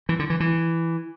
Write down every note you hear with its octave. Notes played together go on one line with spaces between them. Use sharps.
E3
D3
E3
E3